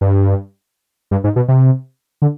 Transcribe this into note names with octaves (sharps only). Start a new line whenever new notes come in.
G2
G2
G#2
B2
C3
D3